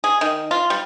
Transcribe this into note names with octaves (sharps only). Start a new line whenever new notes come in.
G#4
D#3
F4
G3